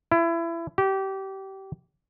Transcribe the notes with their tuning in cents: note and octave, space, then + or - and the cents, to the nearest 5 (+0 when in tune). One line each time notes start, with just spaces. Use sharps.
E4 +25
G4 -25